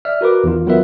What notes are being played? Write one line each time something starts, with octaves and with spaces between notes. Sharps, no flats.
D5 E5 F6
F#4 A#4 B4 D6
E2 D#3 F4
F#3 B3 F4 A#4 B4 E5